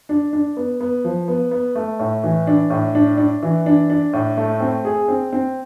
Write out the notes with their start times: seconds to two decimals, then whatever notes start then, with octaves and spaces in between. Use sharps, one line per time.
0.09 D4
0.33 D4
0.57 B3
0.81 B3
1.04 F3
1.28 B3
1.51 B3
1.75 A3
1.99 A2
2.23 E3
2.47 D4
2.70 A2
2.95 D4
3.18 D4
3.43 E3
3.66 D4
3.90 D4
4.13 A2
4.37 A3
4.60 C4
4.85 G#4
5.08 C4
5.33 C4